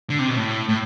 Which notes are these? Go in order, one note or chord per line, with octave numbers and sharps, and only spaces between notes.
D3
C3
B2
A2
A2